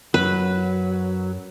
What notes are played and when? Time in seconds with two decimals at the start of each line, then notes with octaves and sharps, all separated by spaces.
0.14 F#2 F#3 B4